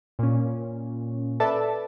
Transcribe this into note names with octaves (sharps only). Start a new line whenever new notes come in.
A#2 C#4
A4 B4 D5 E5 A5